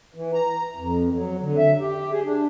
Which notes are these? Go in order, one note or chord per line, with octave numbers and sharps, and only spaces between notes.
E3
A#5
F2
F#3
D3
E5
G4
G#4
D4